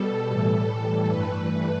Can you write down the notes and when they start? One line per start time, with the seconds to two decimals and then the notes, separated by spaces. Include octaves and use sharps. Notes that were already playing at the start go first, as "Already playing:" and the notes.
Already playing: B2 G3 A4
0.28 A2 E3 G3
1.09 G2 E3 A3 B4